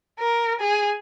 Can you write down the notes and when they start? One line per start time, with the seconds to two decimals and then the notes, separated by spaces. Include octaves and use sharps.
0.20 A#4
0.60 G#4